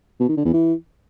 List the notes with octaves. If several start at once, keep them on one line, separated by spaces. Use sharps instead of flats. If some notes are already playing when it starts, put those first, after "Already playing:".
B2
D#3
D3
E2
E3